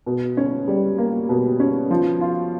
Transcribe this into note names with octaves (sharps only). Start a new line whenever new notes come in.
B2
C#4
G3
A#3
B2
C#4
F3
F4